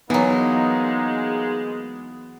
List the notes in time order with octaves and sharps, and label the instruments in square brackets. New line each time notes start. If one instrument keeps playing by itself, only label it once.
[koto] E3 F#3 [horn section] G#3 [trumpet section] A#3 D#4 [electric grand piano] B3